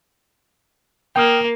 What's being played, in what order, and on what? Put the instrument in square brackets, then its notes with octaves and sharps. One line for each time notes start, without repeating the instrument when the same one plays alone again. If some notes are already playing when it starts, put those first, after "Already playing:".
[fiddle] A#3 [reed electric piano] G5 D#6 F6